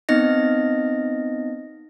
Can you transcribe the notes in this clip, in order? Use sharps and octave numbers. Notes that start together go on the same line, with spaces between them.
B3 C4 D#4 D#5 A#6